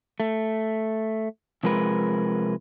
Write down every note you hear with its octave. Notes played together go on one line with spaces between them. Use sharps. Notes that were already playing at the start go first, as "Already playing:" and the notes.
A3
C3 F3 G#3 A#4 B4